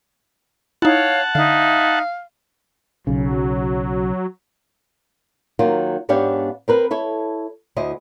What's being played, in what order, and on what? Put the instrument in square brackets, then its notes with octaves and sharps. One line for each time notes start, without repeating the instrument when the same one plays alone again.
[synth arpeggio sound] D#4 E4 [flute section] C#5 F5 [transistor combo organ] F#5 A5
[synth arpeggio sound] D3 [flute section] D#4 E5 [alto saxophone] F5
[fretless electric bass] B1 C#3 [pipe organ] F#3
[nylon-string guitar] D#3 F#3 A#3 F4
G#2 B3 D4 G4 C#5 F5
C4 A#4 B4
E4 A4 C#5
D2 E4 C5 D#5